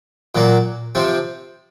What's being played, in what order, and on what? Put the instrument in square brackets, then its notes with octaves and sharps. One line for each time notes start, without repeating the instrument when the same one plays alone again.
[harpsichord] A#2 F#3 A#3
C3 F3 C4